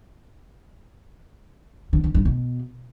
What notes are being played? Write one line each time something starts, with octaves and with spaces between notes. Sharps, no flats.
D3
D3
G2
B2